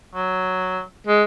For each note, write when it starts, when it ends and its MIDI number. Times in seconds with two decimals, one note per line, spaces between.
0.15 0.81 54
1.07 1.23 56